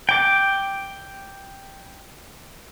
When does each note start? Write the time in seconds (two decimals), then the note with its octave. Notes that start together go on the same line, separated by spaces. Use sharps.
0.09 G5 D6